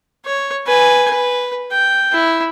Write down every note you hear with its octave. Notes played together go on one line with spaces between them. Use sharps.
C#5
B4 G#5
B4
G5
E4